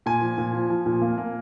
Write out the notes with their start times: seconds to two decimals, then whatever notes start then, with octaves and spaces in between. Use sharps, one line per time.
0.06 A#2 G#5
0.21 F3
0.38 A#2
0.54 F3
0.70 F3
0.86 A#2
1.01 A#3
1.18 A#3